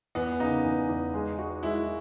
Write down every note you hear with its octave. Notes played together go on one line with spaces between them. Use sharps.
E2 B3
C#3 D#4
E2
E2
G#3
F#4
G#3 E4